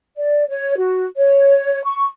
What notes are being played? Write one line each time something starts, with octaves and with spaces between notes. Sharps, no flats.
D5
C#5
F#4
C#5
C#6